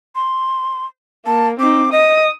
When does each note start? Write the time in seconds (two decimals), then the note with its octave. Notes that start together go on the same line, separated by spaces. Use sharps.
0.15 C6
1.26 A#3 A5
1.60 C4 D#4 D6
1.92 D#5 D#6